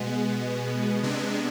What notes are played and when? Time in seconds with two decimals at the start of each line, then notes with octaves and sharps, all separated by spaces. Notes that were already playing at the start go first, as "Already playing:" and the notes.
Already playing: B2 G#3 B3
1.03 C3 G#3 B3 D4